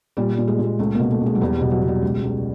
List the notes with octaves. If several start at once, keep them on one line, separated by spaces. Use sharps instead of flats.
A#2 G3
G3
A#2
G#3
A#2 G#3
C#2 A3
B2 A#3
A3
C#2
G#3
F#3
E2 G3
G3
B2
F#3
B2
G3
C#2
C#2